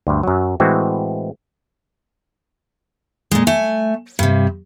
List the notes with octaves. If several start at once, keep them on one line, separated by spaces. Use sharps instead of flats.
D2 G2
F#2 F#3
A2 E3 G#3 C4 F#4
A#2 G#3
A3 G#5
G2 C3